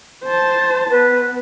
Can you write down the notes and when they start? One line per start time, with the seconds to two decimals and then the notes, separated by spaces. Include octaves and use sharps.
0.25 C5 A5
0.90 B3 B4